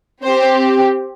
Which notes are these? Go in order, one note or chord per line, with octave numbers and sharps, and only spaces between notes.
C4 G4 C5